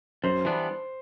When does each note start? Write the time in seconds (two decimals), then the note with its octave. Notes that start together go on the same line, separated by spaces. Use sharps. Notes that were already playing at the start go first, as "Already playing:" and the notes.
0.23 F#2 C5
0.45 E3 G3 B3 D4